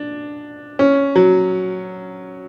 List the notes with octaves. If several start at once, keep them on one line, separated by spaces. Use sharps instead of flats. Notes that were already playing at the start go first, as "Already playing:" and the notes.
Already playing: D4
C#4
F#3